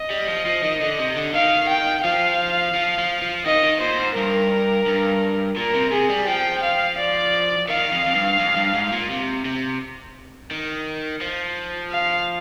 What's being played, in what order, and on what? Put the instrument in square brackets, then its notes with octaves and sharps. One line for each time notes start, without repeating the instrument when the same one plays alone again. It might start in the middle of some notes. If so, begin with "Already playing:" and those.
Already playing: [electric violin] D#5
[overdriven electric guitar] G3
F3
F3
D#3
D3
C3
D3
[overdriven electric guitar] D#3 [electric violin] F5
[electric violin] G5
[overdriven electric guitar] F3 [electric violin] F5
[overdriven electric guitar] F3
F3
F3
[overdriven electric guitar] D#3 [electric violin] D#5
[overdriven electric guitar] D#3
[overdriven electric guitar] A#2 [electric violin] C5
[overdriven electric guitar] G#2
[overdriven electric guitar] G2 [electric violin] A#4
[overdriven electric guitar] G2
[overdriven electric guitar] A#2 [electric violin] A#4
[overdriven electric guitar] C3
[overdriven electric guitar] C3 [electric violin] G#4
[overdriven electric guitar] G3
[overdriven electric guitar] F3 [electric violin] G5
[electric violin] F5
D5
[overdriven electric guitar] D#3 [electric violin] F5
[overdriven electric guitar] F2
F2
G2
F2
G2
G#2
A#2
C3
C3
D#3
F3
[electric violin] F5